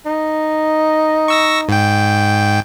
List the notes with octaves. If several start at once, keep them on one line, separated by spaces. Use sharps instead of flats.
D#4
C#6 E6 A#6
G#2 G5